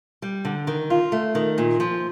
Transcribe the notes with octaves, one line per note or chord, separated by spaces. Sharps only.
G3
D3
D#3
F4
A3
D#3
A#2
F3